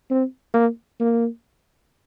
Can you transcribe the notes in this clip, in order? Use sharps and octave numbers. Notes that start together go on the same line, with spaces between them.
C4
A#3
A#3